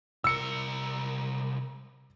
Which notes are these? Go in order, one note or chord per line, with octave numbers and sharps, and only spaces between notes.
C2 A#4 E6 C#7